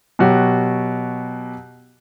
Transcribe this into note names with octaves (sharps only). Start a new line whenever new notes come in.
B2 F#3 F#4 G4